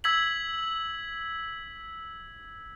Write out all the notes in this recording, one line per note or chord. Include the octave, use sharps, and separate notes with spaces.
E6 G#6 B6 F#7